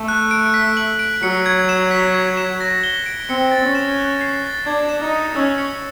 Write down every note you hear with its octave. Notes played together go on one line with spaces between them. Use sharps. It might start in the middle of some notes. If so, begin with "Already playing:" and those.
Already playing: A3
F#6
D7
B6
F#7
D7
F#3 C#7
G#6
E7
B6
G#6
E7
A#6
G7
D7
C4 C#7
A6
C#4
E7
F#6
C7
A6
D4 G#6
E7
D#4
C#7
C#4 E6
C#7